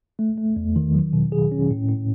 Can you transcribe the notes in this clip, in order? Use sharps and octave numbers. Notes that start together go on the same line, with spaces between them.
A3
A3
E2
D#3
F#3
B2
G#4
C#4
A2
A2